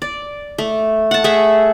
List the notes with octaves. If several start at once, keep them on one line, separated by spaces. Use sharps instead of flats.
D5
A3
F#5 A5
A3 G#4 E5 F#5